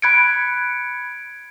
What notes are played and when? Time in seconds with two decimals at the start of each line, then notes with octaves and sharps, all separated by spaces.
0.02 B5 F#6 G#6 C#7 D7